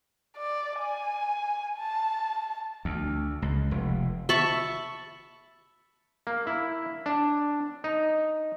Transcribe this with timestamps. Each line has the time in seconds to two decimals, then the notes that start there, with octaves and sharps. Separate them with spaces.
0.37 D5
0.80 G#5
1.78 A5
2.85 D2
3.42 C#2
3.71 F1
4.29 E5 A5 B5 C#6
6.27 A#3
6.47 E4
7.06 D4
7.84 D#4